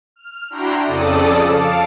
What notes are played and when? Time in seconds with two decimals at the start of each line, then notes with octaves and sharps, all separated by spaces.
0.16 F6
0.50 D4 E4 F#4 G5 A#5 C6
0.83 F2 C#3 A4 D5 D#6
1.44 F5 A5 C#7 D7